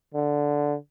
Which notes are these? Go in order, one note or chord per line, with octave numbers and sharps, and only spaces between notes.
D3